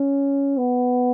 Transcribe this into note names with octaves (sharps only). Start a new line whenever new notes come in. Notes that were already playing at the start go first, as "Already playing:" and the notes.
Already playing: C#4
B3